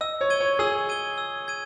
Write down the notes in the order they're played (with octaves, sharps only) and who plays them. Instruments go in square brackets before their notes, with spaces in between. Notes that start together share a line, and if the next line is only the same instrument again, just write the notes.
[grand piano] D#5 [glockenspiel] E6
[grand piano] C#5
[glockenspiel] G#6 D#7 G7
[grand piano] C#5
[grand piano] G#4 [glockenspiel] E6
[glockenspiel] G#6 D#7 G7
E6
G#6 D#7